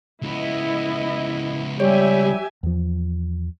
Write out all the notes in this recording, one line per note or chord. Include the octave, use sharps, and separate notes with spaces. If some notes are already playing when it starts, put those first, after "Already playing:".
C#2 B3 E4 D#5
G3 G4 C#5 E5 G#5
E2 F3